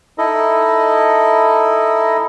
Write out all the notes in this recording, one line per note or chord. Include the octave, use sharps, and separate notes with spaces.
D#4 E4 A4 D#5